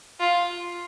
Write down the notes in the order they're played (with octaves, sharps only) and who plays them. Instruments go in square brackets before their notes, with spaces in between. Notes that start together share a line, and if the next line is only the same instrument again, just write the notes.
[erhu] F4